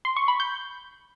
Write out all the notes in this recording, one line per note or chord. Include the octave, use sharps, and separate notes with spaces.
C6
C#6
B5
G6